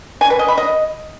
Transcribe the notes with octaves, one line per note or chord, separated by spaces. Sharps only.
G#5
B4
D#5
B5
D#5